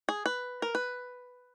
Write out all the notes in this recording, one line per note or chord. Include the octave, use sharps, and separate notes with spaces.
G#4
B4
A#4
B4